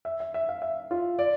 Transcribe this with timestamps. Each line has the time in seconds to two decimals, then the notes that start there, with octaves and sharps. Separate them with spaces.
0.05 E5
0.20 E5
0.34 E5
0.49 F5
0.62 E5
0.91 F4
1.19 D5